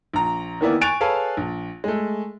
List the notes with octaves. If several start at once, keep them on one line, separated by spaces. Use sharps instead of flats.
A#1 A#5
D#3 E3 A#3 B3 E4 D5
G#5 C#6 F#6 A6 D7 F7
G#4 A4 B4 C#5 F5 A5
A#1
G#3 A3